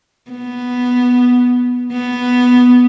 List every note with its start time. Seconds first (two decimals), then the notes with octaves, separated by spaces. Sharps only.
0.31 B3
1.92 B3